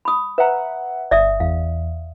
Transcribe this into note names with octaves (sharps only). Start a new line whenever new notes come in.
B5 D#6
B4 E5 F#5 A#5
G1 D5 E5 D#6
E2 F5